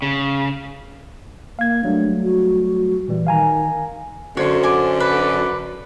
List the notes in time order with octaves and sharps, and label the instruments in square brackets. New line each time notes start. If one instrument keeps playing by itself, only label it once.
[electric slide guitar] C#3
[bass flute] A#3 [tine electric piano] F5 G#6
[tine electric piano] F#3 G3 A3 [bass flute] D4
[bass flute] F#4
[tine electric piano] A#2 E3 G3
[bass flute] D#3 [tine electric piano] F5 G#5 A#5
[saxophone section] F#2 D3 [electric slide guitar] F#4 C5 [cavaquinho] C#5
[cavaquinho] G#5 D6
B4 D5